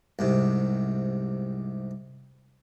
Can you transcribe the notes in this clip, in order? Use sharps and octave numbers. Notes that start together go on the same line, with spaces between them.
C2 G#2 C3